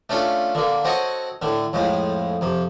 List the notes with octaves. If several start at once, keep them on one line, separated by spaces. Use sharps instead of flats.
A3 C#4 D4 F4 A4
D3 A#3
C4 F#4 A4 C#5 D#5
A2 D3
F2 A2 F3 G#3
F2 C3